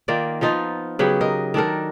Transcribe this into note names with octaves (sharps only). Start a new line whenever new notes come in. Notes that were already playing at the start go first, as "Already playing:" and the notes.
D#3 A#3 F4 D5
F3 B3 D#4 F4
C#3 F#3 B3 G4
A#4 D#5
D#3 D4 A4 A#4